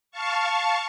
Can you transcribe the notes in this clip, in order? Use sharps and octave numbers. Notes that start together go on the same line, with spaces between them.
F5 A5 C#6